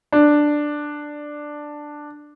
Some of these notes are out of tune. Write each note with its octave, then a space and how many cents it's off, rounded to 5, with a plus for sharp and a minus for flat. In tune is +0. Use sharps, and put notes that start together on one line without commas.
D4 +5